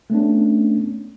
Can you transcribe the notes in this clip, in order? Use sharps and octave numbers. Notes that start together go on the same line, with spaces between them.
A3 B3 C#4 D4